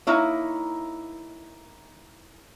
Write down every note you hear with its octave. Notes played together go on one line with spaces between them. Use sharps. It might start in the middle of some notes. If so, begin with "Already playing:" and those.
A#3 D#4 E4 C#5